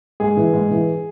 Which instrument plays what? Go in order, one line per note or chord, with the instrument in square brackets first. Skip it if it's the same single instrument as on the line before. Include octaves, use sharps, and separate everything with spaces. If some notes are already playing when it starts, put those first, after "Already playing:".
[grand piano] G#2 G#4
E3
G#2
E3